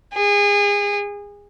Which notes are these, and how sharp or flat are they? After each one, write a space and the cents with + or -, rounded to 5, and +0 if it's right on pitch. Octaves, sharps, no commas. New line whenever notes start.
G#4 -30